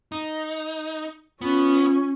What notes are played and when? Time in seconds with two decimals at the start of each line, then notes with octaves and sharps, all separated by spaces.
0.12 D#4
1.41 B3 C#4 F4